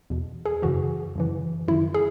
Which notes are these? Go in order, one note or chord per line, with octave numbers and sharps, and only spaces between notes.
E2 B2
G#4
F#2 C#3 E3 F#4
F#2 C#3 E3
F#2 D#3 E4
G#4